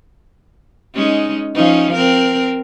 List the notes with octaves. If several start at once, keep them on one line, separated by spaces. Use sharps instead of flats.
G#3 C#4 D#4
F3 C#4 D#4
C4 A#4